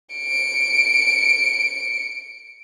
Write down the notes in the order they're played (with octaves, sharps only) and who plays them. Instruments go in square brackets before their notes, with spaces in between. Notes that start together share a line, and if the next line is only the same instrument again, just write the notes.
[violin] C#7 D7